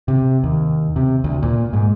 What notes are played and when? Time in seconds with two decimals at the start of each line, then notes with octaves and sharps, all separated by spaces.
0.08 C3
0.43 D#2
0.96 C3
1.24 D2
1.43 A#2
1.73 G#2